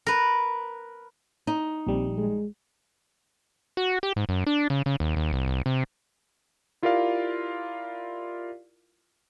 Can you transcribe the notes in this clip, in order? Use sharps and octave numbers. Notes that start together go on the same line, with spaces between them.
A#4 B4
D#4
A#1 G3 C4
G#3
F#4
G4
G#2
F#2
D4
C#3
C#3
D#2
D#2
C2
C2
C3
E4 F4 G4 A#4 D5 F5